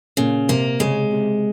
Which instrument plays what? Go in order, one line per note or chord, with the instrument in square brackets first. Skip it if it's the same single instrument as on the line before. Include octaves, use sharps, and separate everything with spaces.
[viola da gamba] A#2 [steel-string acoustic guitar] C#3
[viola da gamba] C3 [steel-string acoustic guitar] A#3
[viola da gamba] C#3 [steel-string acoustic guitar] G#3
[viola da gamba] C3